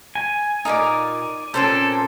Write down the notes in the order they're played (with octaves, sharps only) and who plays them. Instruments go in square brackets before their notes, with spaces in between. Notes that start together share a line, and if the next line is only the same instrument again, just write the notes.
[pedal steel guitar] G#5
[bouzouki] A#2 A#4 F5 [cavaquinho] D#4 D5
[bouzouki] A#2 C4 C#4 [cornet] A4 [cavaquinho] C5